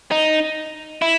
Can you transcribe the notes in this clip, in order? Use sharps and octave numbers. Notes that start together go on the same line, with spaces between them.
D#4
E4